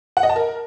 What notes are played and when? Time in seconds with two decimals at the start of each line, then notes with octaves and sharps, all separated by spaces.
0.17 F#5
0.23 D#5
0.29 A5
0.36 A#4